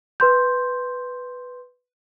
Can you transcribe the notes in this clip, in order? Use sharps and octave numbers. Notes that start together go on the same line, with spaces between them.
B4 C6 G6